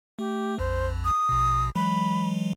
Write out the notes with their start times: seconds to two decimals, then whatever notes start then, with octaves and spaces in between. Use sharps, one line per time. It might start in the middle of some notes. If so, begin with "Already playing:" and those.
0.19 A3 G4
0.59 A#1 F2 C5
1.04 D#6
1.29 A#1 B2
1.75 E3 F#3 G#3 B5